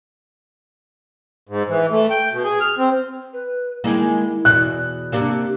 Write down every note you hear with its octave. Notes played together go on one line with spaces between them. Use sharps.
G#2
E3
A3
G5
B2
G#4
F6
C4
B4
D#3 G#3 A#3 E4
E2 B2 F#6
C3 A#3 D4 G4